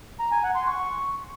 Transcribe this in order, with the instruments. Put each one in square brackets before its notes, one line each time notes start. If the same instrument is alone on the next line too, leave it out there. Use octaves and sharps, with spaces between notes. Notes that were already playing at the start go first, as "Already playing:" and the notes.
[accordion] A#5
G#5
F#5
C6
C#6